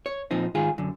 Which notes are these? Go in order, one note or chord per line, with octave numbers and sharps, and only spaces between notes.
C#5
A#2 F3 C4 D#4
G#2 D#3 F4 G#4
F#2 D3